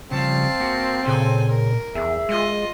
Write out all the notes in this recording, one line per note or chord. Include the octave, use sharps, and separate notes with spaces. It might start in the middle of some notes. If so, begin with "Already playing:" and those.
C#3 F3 G3 C4 F5 A5
A#3 F#4
A#2 C#3 A4 G#5
A#4
E2 G#4 E5
G#3 F4 D#5